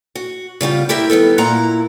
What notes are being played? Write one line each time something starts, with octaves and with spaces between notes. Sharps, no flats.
F#4
C#3 G3 B3 F4
E4 G4 A#4 E5
D#3 G3 B3 A4
A#2 A#3 E4 F#5 A#5